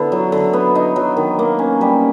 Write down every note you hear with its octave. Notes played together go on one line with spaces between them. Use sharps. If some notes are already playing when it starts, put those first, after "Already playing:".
Already playing: D3 B3 E4
F#3
D3
B3
D#4
F#3
D#3
A#3
C#4
G3